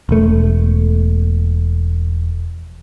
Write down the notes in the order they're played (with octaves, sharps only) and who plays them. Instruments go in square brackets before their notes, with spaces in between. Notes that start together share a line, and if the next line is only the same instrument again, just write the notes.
[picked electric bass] E1 A3